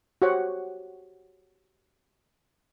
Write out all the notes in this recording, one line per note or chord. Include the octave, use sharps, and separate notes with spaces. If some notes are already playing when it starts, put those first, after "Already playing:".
F#4 G4 C5 C#5 F#5